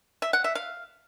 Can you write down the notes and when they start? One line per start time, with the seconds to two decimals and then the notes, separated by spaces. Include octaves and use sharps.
0.22 E5
0.33 F#5
0.44 E5
0.55 F5